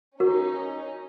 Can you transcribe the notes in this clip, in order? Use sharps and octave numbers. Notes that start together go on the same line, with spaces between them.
C#4 D#4 F#4 A#4